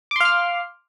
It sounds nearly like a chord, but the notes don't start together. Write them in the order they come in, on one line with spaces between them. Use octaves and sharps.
D6 C6 F5 F6